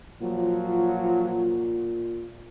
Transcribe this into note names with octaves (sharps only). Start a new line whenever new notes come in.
A#2 F3 F#3